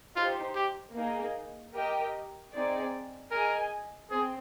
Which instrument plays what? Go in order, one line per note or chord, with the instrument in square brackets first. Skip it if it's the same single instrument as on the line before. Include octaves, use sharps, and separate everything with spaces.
[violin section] D#4 G4 C5 [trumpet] F4
[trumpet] G4
[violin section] A#3 D#4 G#4
G4 A#4 D#5 G5
C4 D#4 G#4 D5
[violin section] G#4 D#5 G#5 [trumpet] A#4
[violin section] C4 [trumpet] G#4